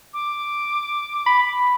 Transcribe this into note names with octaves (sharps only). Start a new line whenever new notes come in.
D6
B5